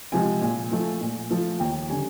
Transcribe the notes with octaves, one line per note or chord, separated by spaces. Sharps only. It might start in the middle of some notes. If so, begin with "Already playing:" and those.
C3 F3 G#3 G#5
A#2
F3 A3
A#2
F3 A3
D#2 G5
D3 G3 G#5